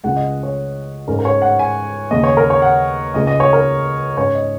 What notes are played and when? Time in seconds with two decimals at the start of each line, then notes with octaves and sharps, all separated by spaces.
0.04 C#2 C#3 G#3 F#5
0.17 D#5
0.43 C#5
1.08 G#2 G#3 C#4 A#4
1.19 A#4
1.25 C#5
1.42 F#5
1.59 G#5
2.11 D#2 C#3 G#3 D#5
2.24 C#5
2.37 A#4
2.50 C#5
2.62 F#5
3.14 C#2 C#3 G#3 D#5
3.27 D#5
3.40 C#5
3.53 A#4
4.17 G#2 G#3 C#4 C#5
4.35 D#5